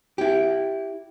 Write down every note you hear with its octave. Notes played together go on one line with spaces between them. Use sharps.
E4 G4